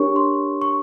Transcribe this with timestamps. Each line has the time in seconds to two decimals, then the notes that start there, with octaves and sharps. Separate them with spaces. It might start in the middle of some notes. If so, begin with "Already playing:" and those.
Already playing: D4 G4 A#4 C#5 C#6
0.16 C6
0.62 C#6